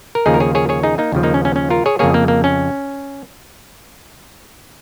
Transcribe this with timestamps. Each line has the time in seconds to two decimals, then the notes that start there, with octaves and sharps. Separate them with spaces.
0.15 A#4
0.26 D#2 C#3 F3 A#3 D#4 G#4
0.34 A#4
0.40 G#4 C#5
0.55 G#4 C#5
0.69 G#4 C#5
0.83 D#4 G#4
0.98 A#3 D#4
1.12 D#2 C#3 F3
1.23 A#3 D#4
1.34 C#4
1.45 C#4
1.56 C#4
1.70 F4 A#4
1.86 G#4 C#5
1.99 F2 C#3 A#3 G#4 C#5
2.14 A#3
2.28 A#3
2.44 C#4